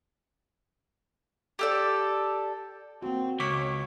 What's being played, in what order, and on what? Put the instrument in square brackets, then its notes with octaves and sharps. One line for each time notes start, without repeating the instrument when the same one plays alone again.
[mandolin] G4 A4 D5
[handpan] A#3 F#4 [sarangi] C4
[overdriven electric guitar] C#2 [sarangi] C#5 [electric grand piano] C#6 D6 B6